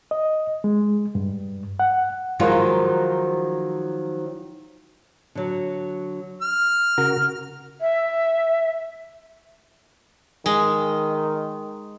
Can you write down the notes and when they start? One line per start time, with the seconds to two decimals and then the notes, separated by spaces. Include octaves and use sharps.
0.11 D#5
0.64 G#3
1.15 G2
1.80 F#5
2.40 D#3 F3 F#3 G#3 F4
5.35 D3 F#3
6.42 F6
6.98 C#3 F#4 A#4
7.81 E5
10.46 D#3 G#3